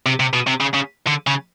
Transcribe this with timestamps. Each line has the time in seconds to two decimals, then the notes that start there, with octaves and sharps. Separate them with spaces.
0.06 C3
0.20 C3
0.33 B2
0.47 C3
0.60 C#3
0.74 C#3
1.07 D3
1.27 C#3